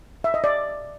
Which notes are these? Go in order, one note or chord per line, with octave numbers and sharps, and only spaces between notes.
E5
D#5
D5